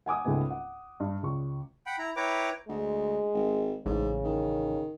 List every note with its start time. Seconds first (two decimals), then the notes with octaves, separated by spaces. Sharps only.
0.06 F#5 G#5 D6 D#6
0.25 C#2 G#2 A3 B3 G#5
0.50 F#5
1.00 G2
1.23 C#2 C#6
1.86 F#5 G5 B5
1.99 E4 A#5
2.17 E4 B4 C#5 G5 A#5 D6
2.69 D2 G#3
3.34 G#1
3.86 A1 G#2 C#3
4.24 D#3